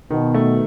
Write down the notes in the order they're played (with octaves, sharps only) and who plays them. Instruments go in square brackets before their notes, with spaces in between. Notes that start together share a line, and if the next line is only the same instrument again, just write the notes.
[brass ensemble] B2 [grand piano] D#3
[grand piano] A3